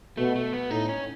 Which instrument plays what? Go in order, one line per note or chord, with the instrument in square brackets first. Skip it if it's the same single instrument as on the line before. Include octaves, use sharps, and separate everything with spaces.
[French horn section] B2 [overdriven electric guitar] A3
[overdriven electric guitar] A3
B3
[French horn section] A2 [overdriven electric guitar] D#4
[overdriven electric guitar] C#4